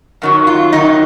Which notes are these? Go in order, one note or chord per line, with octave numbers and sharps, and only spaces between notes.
F#2 D#3 F#3
F4
F#2 D#3 F#3 D#4